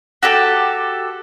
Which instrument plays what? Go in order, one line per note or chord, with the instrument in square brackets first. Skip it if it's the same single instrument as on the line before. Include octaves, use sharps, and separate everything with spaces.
[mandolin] F#4 G4 A4